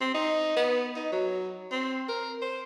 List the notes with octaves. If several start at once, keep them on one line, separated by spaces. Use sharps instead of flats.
C4
D#4
B3
D#4
F#3
C4
A#4
C5